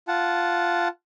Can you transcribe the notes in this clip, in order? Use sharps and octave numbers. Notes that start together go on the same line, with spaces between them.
F4 F#5 A5